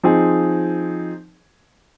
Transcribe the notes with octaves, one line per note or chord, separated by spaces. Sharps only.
F3 C4 D#4 G#4